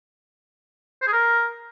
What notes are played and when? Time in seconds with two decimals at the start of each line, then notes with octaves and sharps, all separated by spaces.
1.02 C5
1.07 G#4
1.13 A#4